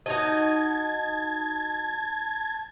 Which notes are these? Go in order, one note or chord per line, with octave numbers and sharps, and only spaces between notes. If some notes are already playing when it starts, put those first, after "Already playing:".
D#4 F#4 D#5 A5 G#6